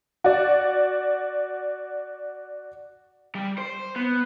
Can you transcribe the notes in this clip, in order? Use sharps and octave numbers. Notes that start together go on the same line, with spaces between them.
F#4 D5
G3
C5
B3